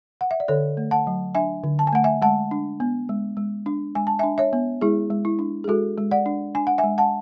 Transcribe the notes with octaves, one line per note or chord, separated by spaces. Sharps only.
F#5
E5
D5
D3 A4 C#5
A3
F#5 A5
F#3
D4 E5 G#5
D3
A5
G#5
A3 F#5
E5 G#5
G#3 F#5 A5
D4
B3
G#3
G#3
D4
G#3 G#5
A5
E5 G#5
D4
C#5 E5
B3
G#3 E4 G#4
G#3
E4
D4
G#4
G#3 F#4 A4
G#3
D5 F#5
D4
D4 G#5
F#5
E5 G#5
G#3
F#5 A5